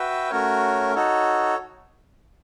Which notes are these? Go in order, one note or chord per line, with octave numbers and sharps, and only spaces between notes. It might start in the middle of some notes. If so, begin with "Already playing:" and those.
Already playing: F#4 B4 E5 G5
A3 C#4 F#4 A#4 C#5
D#4 F#4 A4 C#5